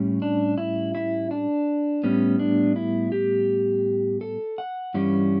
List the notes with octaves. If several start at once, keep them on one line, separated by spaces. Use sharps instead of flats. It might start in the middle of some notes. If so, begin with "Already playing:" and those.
Already playing: A2 G3 C#4
D4
E4
E4
D4
A2 G3 B3 C#4
D4
E4
G4
A4
F#5
G2 E3 G3 C#4